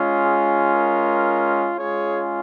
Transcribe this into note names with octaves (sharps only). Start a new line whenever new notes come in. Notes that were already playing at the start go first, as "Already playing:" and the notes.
Already playing: G#3 C#4 F4
G#4
A#4
G#3 C#4 F4 G#4 C#5